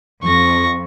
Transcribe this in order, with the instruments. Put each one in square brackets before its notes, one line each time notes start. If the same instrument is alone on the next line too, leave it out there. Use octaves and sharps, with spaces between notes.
[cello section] F2 [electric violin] C#6 A#6